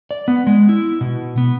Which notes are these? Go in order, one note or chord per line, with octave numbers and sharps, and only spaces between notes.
D5
B3
G#3
E4
B2
B3